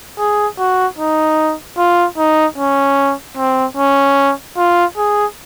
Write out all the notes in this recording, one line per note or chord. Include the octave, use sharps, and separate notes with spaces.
G#4
F#4
D#4
F4
D#4
C#4
C4
C#4
F4
G#4